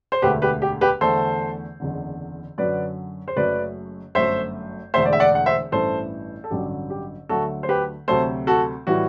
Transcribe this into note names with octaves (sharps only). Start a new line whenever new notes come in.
C5
E1 D2 D3 A3 G4 B4
G4 B4
G4
G4 B4
E2 D3 A3 A4 C5
F#1 E2 D3
F#2 D3 F#3 B4 D5
C5
F#1 F#2 F#3 A3 B4 D5
G1 F#2 F#3 A3 C5 E5
E1 E2 D3 A3 C5 E5
D5
E5
D5 F#5
F#5
C5 E5
A1 G2 E3 A3 A4 C5
A4
A1 G2 D3 F#3 G4
G4
D2 D3 F#3 A3 F#4 A4
C5
G4 B4
D2 C3 F#3 A3 A4 C5
F#4 A4
A2 E3 G3 F#4